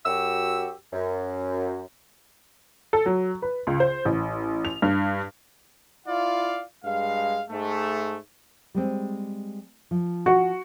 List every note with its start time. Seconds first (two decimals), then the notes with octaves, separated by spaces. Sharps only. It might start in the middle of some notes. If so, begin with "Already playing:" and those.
0.05 F#2 F#4 G4 E6
0.93 F#2
2.93 A4
3.06 F#3
3.42 B4
3.67 C#2
3.80 C5
4.05 A1
4.65 F7
4.82 G2
6.07 E4 F4 D5 F5
6.84 G2 G#3 F5
7.50 G#2 G#3 A3
8.75 G3 G#3 C4
9.91 F3
10.26 F#4